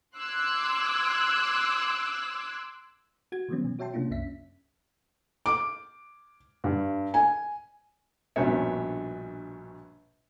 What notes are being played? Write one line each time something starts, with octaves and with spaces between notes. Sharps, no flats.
C6 D6 E6 F#6 G#6
F#4 G#6
D#3 E3 F#3 G3 B3 C#4
B2
F#4 C#5 E5 G5 A5 C6
C3 A#3 C#4 D4 F4
C2 F#2 C#4 E5 B6
D6
G2
G#5
A#1 G2 B2 C#4 C#5 E5